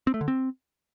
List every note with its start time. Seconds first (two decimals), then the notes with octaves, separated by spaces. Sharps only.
0.07 C4
0.14 A3
0.21 D3
0.28 C4